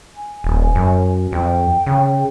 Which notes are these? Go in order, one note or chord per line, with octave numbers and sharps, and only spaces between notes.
G#5
D#1
F#2
F2 G5
C#3